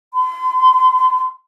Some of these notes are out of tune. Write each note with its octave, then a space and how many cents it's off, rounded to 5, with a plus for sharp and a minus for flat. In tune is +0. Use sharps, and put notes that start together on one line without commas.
C6 -40